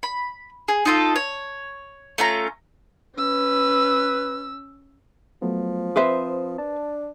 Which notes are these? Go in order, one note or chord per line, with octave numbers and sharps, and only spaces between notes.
B5
G#4
D#4 F4 A4
C#5
A3 C#4 F4 A#5
C#4 B4 E6
F3 F#3 A3 B3
C4 B4 C5 E5 D#6
D4 A5